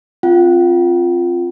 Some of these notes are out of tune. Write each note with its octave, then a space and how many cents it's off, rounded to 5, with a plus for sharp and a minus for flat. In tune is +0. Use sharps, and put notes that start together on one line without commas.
C4 +10 F4 +0 G5 -45